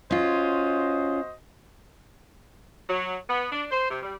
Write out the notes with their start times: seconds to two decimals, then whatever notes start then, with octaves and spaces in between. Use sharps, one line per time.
0.11 C#4 F4 F#4 C5 D#5
2.90 F#3
3.29 B3
3.52 D4
3.71 C5
3.91 C3
4.03 G3